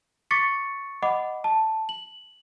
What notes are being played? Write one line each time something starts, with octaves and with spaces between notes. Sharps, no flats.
C#6 D6 A6 B6 C#7
D#5 F#5 B5 D6
A5
F#7